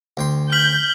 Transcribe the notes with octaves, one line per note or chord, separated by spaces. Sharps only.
D2 G5 C6
F6 G6 B6 F#7